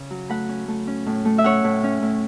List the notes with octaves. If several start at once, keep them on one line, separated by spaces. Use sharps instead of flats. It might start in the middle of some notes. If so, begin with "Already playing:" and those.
Already playing: C#3
F#3
A3 F#5 B5
C#4
A3
C#4
A2
A3
E5
C#4 C#5 F#5
A2
C#4
A2